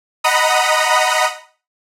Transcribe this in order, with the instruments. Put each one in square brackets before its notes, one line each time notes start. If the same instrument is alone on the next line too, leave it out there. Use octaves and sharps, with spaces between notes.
[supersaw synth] D#5 F#5 A#5 B5 D#6